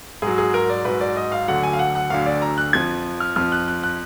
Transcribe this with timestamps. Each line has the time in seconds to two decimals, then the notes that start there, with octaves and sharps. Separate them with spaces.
0.22 G#2 F#3 G#4
0.38 G#4
0.54 A#4
0.69 D5
0.85 G#2 F#3 B4
1.01 D5
1.17 D#5
1.32 F5
1.48 D2 D3 F#3 F#5
1.63 G#5
1.73 F5
1.79 F#5
1.95 F#5
2.10 D2 D3 F#3 F5
2.26 D5
2.42 A#5
2.58 F#6
2.73 F2 F3 G#6
3.20 F6
3.36 F2 F3 F6
3.52 F#6
3.68 F#6
3.84 F#6